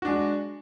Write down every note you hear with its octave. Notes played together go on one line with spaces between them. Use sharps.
G#3 D4 F#4